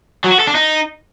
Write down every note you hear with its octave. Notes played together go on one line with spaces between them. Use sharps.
F#3
F#4
A4
D4
D#4